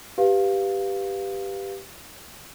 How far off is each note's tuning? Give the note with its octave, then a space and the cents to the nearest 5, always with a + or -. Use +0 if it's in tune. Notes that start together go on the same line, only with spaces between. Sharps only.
G4 +0 B4 +0 F5 +0